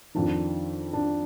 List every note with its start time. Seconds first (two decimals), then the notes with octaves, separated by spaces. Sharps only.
0.15 F2 D#3 D4
0.93 D4